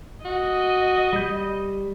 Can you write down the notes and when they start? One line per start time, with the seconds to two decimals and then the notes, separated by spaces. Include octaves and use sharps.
0.25 F#4 D#5
1.13 G3 G6